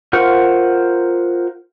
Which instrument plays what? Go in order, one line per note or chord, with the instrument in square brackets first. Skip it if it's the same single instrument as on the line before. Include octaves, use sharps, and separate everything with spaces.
[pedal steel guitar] F4 A#4 C5 F#5 C#6